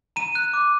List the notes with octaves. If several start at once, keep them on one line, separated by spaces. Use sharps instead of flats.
A#5 D#7
F#6
D6